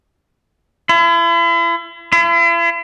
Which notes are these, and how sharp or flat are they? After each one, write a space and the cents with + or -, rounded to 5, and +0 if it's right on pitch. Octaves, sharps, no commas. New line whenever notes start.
E4 +40
E4 +45